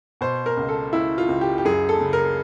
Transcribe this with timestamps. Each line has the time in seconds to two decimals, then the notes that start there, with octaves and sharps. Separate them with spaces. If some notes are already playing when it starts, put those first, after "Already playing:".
0.21 B2 C5
0.46 A#4
0.57 C#2
0.69 A4
0.93 C#2 E4
1.18 F4
1.29 C#2
1.41 G4
1.58 G4
1.65 F#2 G#4
1.89 A4
2.01 C#3
2.13 A#4